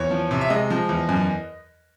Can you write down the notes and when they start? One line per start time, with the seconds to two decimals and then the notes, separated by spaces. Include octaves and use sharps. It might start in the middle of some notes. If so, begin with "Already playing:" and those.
Already playing: E2 C#5
0.11 F3
0.31 C3
0.41 E5
0.50 G#3 D#5
0.70 F3
0.89 E2
1.09 F#2